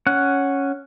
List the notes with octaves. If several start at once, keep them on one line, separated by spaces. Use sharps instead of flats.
C#4 F#5